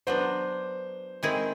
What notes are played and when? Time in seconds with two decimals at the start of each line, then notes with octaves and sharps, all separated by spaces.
0.07 F#3 B3 D4 C5
1.23 D#3 G#3 C4 E4 G#4